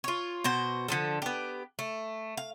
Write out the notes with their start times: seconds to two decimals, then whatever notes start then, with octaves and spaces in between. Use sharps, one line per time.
0.04 F4 C#5
0.44 B2 F#4 C5
0.88 D3 F3 A4
1.22 B3 G4
1.79 A3
2.37 F5